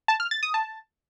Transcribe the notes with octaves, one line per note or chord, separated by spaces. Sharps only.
A5
F6
A6
D#6
A5